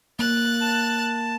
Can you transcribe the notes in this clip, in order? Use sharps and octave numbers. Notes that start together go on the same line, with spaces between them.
A#3 F#6 A6
A5